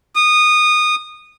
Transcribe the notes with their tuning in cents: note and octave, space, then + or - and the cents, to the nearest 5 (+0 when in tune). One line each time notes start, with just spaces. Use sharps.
D#6 -20